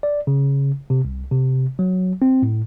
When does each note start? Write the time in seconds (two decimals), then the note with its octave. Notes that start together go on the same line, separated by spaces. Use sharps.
0.03 D5
0.27 C#3
0.90 C3
1.05 C2
1.31 C3
1.79 F#3
2.22 C4
2.42 A2